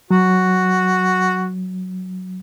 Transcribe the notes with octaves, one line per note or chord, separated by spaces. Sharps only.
F#3 F#4